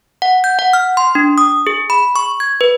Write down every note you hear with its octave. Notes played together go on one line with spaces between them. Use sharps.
F#5
G6
F#5
F6
C6
D4
D#6
G#4
B5
C#6
G#6
B4